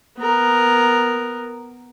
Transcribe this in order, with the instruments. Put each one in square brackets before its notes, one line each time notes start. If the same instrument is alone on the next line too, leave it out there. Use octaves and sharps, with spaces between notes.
[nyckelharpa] B3 A#4